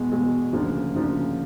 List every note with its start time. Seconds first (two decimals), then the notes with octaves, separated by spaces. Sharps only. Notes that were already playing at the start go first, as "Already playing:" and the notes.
Already playing: E2 B2 G#3
0.12 E2 B2 G#3
0.52 D2 C#3 F3 A#3 D4
0.94 D2 C#3 F3 A#3 D4